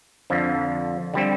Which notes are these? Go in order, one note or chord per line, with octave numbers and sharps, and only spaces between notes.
F2 D3 F3
D3 G3 C4